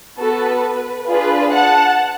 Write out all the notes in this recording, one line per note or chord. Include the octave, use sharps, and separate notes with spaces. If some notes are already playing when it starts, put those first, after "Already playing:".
B3 F#4 A4 B4
D4 F4 G#4 B4
F#5 A5